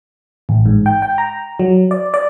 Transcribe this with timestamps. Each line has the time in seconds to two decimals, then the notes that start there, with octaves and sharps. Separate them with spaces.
0.49 A1
0.66 G#2
0.86 G5
1.02 G5
1.18 A#5
1.59 F#3
1.91 D5
2.14 D5